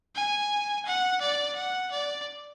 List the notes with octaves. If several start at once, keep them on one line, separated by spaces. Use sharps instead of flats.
G#5
F#5
D5
F#5
D5